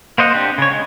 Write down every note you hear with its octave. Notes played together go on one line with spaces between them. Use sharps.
A#3 C5 D#5 F#5
C4 D4 G4
C#3 C#5
G#3